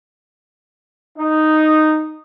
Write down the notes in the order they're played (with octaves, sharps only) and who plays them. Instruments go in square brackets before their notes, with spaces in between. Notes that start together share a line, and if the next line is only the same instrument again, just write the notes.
[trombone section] D#4